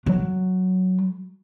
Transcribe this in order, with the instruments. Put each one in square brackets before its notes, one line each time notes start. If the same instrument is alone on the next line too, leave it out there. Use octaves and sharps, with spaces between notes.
[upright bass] F#3